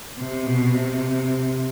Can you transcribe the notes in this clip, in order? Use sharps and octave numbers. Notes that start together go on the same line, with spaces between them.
C3
B2
C3